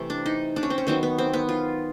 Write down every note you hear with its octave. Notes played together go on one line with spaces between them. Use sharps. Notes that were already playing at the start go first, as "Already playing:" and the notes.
Already playing: C3 E3 A3
D4
D#4
D4
C#4
C4
C#4
D#3 F#3 B3 C4
B3
C4
B3
F4